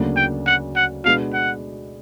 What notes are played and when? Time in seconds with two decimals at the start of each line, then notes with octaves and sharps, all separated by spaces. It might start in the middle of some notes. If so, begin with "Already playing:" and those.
Already playing: D2 C#3 F#3 A#3 D4
0.17 G5
0.47 F#5
0.76 F#5
1.04 B2 G#3 B3 D4 F#4 F5
1.34 F#5